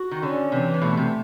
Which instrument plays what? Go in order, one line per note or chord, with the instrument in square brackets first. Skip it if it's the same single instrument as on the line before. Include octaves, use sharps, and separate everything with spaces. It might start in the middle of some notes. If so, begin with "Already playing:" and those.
Already playing: [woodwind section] F#4
[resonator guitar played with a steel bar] D#3
[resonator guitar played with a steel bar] D3 [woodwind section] C#4
[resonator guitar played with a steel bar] C3 [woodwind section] E3
[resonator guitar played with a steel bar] C3
[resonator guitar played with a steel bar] B2 [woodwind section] A3
[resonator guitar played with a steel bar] C3